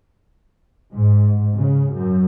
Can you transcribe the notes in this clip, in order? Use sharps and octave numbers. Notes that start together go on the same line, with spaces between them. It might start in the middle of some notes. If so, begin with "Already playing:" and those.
G#2
C#3
F#2